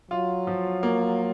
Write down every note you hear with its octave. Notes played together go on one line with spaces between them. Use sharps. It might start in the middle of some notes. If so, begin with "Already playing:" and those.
F#3 F4
F3
A#3